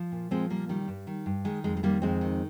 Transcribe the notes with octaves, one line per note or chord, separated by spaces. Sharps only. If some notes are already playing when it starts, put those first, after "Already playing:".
Already playing: F3
A#2
F3 G#3 C4
A#2 G3 A#3
D#3 G3
G2
D#3
G2
D#3 G#3
F2 G#3
G#3
D#3 G3 A#3
F2 G#3 C4
D#3